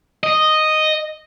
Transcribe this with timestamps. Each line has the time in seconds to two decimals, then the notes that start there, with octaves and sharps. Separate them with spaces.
0.23 D#5